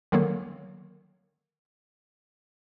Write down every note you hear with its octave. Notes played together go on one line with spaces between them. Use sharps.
D3 D#3 F#3 A#3